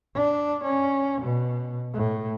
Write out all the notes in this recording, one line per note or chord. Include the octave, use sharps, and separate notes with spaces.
D4
C#4
B2
A2